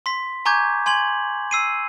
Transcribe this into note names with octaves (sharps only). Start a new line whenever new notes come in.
C6 B6
G#5 A#5 C#6 D6 G6 G#6
G#5 C6 G#6 F#7
E6 C7 D#7